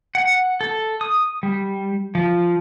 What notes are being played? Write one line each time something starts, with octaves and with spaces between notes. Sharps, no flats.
F#5
A4
D#6
G3
F3